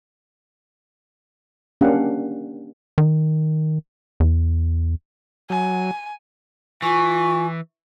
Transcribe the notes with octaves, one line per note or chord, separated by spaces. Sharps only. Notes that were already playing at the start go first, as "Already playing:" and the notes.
A#3 C#4 D4 G4 F5 F#5
D#3
E2
F#3 G#5
E3 F4 G#5 C#6